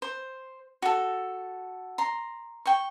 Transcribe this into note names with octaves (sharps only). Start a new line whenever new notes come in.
C5
F#4 A4
A#5 C6
G5 C#6